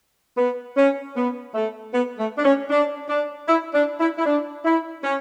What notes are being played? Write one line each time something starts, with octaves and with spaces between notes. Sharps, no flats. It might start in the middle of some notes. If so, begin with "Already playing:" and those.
B3
C#4
B3
A3
B3
A3
D4
C#4
D4
D4
E4
D4
E4
E4
D4
E4
C#4